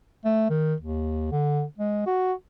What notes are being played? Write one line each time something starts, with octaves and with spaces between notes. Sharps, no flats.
A3
D#3
D#2
D3
G#3
F#4